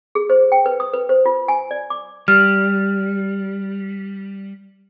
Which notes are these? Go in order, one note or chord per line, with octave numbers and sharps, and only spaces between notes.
G#4
C5
G5
B4
D#6
B4
C5
F4
G#5
D5
D6
G3 F6